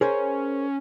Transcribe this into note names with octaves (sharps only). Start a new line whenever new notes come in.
C#4 G#4 A#4 C5